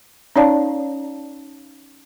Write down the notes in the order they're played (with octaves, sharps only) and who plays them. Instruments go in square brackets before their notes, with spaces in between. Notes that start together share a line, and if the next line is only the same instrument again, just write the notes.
[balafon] C#4 D#4 C#5 D5 F5 A5